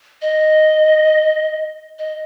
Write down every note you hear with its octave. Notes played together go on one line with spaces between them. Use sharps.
D#5
D#5